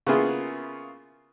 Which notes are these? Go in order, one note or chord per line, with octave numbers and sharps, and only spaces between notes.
C#3 A#3 B3 E4 F4 G#4